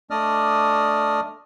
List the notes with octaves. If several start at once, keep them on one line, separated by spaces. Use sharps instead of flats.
A3 D4 D5 D#5 D#6 F6